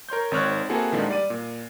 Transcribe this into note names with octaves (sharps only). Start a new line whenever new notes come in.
A#4 C#5 C6 G6
G#1 D#3 C4 C#5 F6 F#6
A#3 C4 E4 F#4 G#4 A4
A#1 D3 D#3 F3 G#3
G3 D5 D#7
A#2